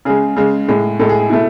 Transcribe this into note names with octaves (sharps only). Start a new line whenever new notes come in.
C#3 G#3 G#4
C#3 G#3
A2 G#3
A2 G#3 A4
G#4
G#4
B2 A3 E4